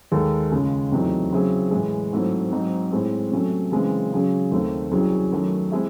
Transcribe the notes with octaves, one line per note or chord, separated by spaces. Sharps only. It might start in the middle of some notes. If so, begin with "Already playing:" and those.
D#2 D#3 G#3 D#4 A4
C#2 C#3 G#3 C#4
E2 C3 F#3 A3 D#4
C#3 F#3 C4 E4 G#4
A2 E3 G#3
G#2 F#3 A3 C4 E4
G#2 F#3 C4 D#4
A2 G#3 C4
C3 F#3 A3 C#4
F#2 C#3 E3 G#3 C4
C#3 F#3 C#4 G#4
D#2 D#3 A3 C4
C2 C3 F#3 C#4 G#4
F#2 D#3 F#3 A3
G#3 C4 E4